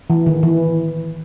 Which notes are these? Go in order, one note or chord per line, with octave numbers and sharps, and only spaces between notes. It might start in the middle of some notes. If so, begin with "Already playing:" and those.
E3
D#3
E3